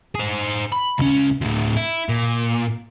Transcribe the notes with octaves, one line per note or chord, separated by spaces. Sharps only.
G#4 C5
B5
C#2 C#4
D2 A2
E4
A#2